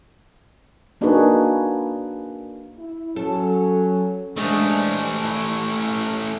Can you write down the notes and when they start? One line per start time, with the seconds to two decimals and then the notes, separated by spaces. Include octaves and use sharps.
1.01 A#3 D4 D#4 F#4 G#4 B4
2.78 E4
3.16 F#3 C#4 A4
4.37 G#3 A3 C#4 D4 C5
5.24 E4